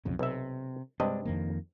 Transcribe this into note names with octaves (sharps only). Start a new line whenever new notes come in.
B1 F2 C#3
B1 C3 E5
G2 C3 G#3 D4 D#5
F2 D#3 A#3